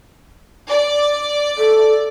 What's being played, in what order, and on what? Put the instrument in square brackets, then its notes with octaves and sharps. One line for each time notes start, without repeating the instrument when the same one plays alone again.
[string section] D5
[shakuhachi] A4